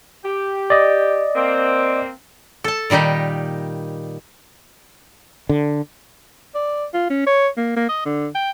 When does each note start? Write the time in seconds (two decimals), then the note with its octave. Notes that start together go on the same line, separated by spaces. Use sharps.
0.24 G4
0.70 D5 D#5
1.36 A#3 C4
2.64 A4 A5
2.90 A#2 D#3 G3 D#4 G4
5.49 D3
6.55 D5
6.94 F4
7.10 C#4
7.26 C#5
7.57 A#3
7.76 A#3
7.89 D#5
8.05 D3
8.35 G5